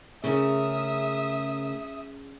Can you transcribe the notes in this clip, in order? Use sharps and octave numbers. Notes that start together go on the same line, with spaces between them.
C#3 A3 C#4 G#4 A#4 E5 D#6